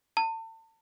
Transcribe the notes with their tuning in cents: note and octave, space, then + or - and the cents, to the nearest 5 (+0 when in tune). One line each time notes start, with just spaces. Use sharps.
A5 +35